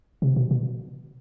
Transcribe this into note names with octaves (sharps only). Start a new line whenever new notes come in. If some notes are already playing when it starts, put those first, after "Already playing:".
C3
B2
B2